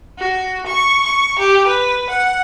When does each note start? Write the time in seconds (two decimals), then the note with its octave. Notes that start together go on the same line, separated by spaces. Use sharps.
0.19 F#4
0.67 C#6
1.05 C#6
1.39 G4
1.67 B4
2.10 F#5